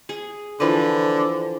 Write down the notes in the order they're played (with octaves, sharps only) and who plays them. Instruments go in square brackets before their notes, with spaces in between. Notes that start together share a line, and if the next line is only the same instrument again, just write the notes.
[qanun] G#4
[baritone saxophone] D3 [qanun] E3 F3 B4